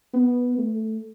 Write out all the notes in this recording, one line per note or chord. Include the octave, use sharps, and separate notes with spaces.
B3
A3